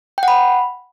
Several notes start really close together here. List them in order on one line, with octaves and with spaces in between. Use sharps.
G5 F#5 B5